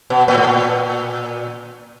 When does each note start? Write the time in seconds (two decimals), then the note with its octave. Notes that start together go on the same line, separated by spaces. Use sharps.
0.10 B2
0.28 A#2
0.38 A2
0.47 A#2